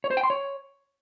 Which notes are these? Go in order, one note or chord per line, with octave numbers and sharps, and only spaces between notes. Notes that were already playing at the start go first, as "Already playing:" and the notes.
C#5
C5
G5
C6
C#5